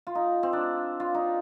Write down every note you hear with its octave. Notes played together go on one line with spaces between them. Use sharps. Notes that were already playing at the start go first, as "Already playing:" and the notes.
F4
D#4
C4
D4
F4
D#4